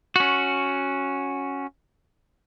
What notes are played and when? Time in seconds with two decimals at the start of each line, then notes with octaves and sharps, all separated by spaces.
0.16 C#4 F#4